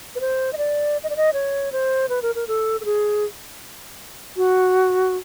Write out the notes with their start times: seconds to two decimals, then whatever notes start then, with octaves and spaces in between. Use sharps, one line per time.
0.15 B4
0.21 C5
0.53 D#5
0.58 D5
1.03 D#5
1.10 D5
1.17 D#5
1.33 C#5
1.72 C5
2.09 B4
2.22 A#4
2.35 A#4
2.48 A4
2.81 A4
2.85 G#4
4.37 F#4